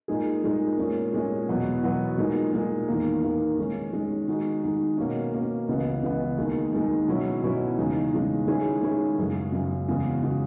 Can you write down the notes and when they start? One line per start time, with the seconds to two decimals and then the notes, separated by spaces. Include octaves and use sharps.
0.08 A#2 G#3 D#4 G#4
0.43 A#2 G#3 D#4 G#4
0.78 A#2 G#3 C#4
1.12 A#2 G#3 C#4
1.48 E2 B2 F#3 B3 F#4
1.83 E2 B2 F#3 B3 F#4
2.18 A#2 G#3 D#4
2.53 A#2 G#3 D#4
2.88 E2 D#3 A#3
3.23 E2 D#3 A#3
3.58 D#3 G#3 C#4
3.93 D#3 G#3 C#4
4.28 D#3 G#3 D#4 F#4
4.63 D#3 G#3 D#4 F#4
4.98 B2 A#3 C#4
5.33 B2 A#3 C#4
5.68 C#2 C#3 E3 B3
6.03 C#2 C#3 E3 B3
6.38 D#2 D#3 G#3 D#4
6.73 D#2 D#3 G#3 D#4
7.08 B2 F#3 C#4 E4
7.43 B2 F#3 C#4 E4
7.78 E2 C#3 G#3 D#4
8.13 E2 C#3 G#3 D#4
8.47 D#3 G#3 C#4 E4 G#4
8.83 D#3 G#3 C#4 E4 G#4
9.18 F#2 C#3 G#3
9.52 F#2 C#3 G#3
9.88 E2 C#3 G#3 B3 F#4
10.23 C#3 G#3 B3 F#4